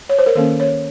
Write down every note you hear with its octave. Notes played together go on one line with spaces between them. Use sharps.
C#5
C5
A#4
D#3 A#3 C#4 A4
C#5